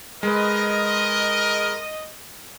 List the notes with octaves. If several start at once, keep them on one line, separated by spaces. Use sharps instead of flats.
G#3 A#4 B4 D#5